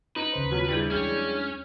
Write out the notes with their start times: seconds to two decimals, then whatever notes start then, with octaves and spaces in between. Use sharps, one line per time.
0.16 D#4 B4
0.33 D#2 C#3 C5
0.51 B2 F#3 F4
0.68 G3 D4 E4 G#4 G6
0.91 E2 F#3 G#3 C#4